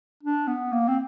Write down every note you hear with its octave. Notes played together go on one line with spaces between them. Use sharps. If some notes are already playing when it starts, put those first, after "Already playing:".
D4
B3
A#3
C4